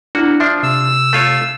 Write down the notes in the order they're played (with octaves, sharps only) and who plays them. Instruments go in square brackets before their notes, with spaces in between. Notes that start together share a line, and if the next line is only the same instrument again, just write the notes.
[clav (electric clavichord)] A#3 F#4 [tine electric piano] D4 E4
[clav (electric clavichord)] F3 D4 [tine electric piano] E5 C7
[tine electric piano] C3 [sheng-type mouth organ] E6
[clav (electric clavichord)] A3 F4 C#5